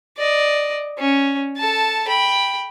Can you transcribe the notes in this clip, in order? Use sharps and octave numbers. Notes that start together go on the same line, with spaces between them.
D5 D#5
C#4
A4 A5
G5 B5